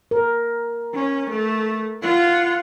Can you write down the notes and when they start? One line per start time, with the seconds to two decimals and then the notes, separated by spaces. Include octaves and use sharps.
0.11 A#4
0.94 C#4
1.29 A3
2.02 F4 F#5